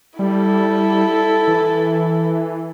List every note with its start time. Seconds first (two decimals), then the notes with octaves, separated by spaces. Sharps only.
0.19 G3 E4 A4
1.48 E3